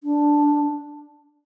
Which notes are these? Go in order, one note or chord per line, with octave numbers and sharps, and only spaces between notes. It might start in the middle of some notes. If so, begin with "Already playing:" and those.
D4